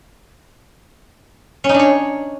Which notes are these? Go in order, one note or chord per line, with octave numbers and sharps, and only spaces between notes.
C#4
D#4
D4
C#5